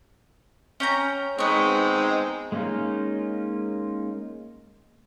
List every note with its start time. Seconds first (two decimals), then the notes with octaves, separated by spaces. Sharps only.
0.80 C#4 G5 A#5
1.38 G#3 B3 C4 D#4 C#6
2.52 G#3 A#3 C#4 D#4 F4